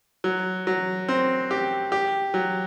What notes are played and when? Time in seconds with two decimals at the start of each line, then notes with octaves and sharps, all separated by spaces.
0.24 F#3
0.67 F#3
1.08 C4
1.51 G4
1.92 G4
2.34 F#3